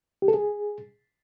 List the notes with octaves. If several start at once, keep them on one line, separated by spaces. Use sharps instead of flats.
G4
A4
G#4